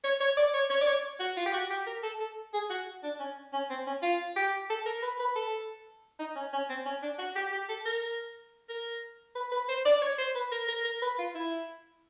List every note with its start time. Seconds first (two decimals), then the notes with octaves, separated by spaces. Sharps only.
0.04 C#5
0.20 C#5
0.37 D5
0.54 C#5
0.70 C#5
0.81 D5
0.87 C#5
1.20 F#4
1.37 F4
1.46 G4
1.54 F#4
1.70 G4
1.87 A#4
2.03 A4
2.20 A4
2.53 G#4
2.70 F#4
3.03 D4
3.20 C#4
3.53 C#4
3.70 C4
3.87 C#4
4.03 F4
4.36 G4
4.70 A4
4.86 A#4
5.02 B4
5.20 B4
5.36 A4
6.20 D#4
6.36 C#4
6.53 C#4
6.69 C4
6.86 C#4
7.02 D4
7.19 F#4
7.36 G4
7.52 G4
7.69 A4
7.86 A#4
8.69 A#4
9.36 B4
9.52 B4
9.69 C5
9.86 D5
10.02 C#5
10.19 C5
10.35 B4
10.52 A#4
10.69 A#4
10.85 A#4
11.02 B4
11.19 F4
11.35 E4